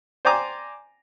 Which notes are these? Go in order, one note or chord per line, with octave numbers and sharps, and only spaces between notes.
C5 D5 G5 G#5 A#5 D6